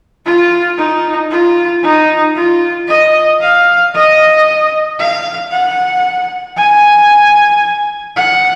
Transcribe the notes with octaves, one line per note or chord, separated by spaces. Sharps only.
F4
D#4
F4
D#4
F4
D#5
F5
D#5
F5
F#5
G#5
F#5